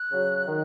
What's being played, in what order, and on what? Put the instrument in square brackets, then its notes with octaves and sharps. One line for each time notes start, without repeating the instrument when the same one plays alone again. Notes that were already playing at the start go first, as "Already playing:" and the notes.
Already playing: [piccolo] F#6
[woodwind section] C#3 F#3
D#3